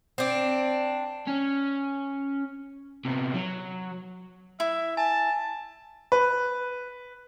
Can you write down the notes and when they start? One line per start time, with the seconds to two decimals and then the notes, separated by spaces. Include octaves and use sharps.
0.18 C4 D4
1.27 C#4
3.05 C3 B3
3.34 F#3
4.60 E4 E5
4.97 G#5 A5
6.12 B4